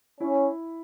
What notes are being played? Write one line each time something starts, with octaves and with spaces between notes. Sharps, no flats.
C#4 E4